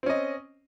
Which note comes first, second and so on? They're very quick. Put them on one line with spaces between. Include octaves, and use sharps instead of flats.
C4 C#4 D#5